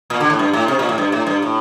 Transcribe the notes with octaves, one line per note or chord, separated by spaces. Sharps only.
A#2
D3
A2
G2
A2
C3
A#2
A2
G2
A2
G2
A2